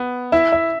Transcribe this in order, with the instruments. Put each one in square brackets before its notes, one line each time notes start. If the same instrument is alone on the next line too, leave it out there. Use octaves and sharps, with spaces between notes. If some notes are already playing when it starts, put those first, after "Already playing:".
Already playing: [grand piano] B3
[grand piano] E4 [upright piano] E5
[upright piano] E5